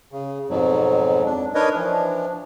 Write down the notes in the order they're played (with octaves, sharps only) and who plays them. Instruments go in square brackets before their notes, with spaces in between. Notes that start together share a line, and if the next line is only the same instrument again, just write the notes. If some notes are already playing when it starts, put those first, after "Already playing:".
[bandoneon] C#3
F2 G#2 B2 F#3
D4
D4 D#4 A#4 B4 C#5 D#5
E3 F3 D4